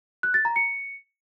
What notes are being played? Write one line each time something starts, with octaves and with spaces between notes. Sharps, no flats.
F#6
A6
A#5
C#7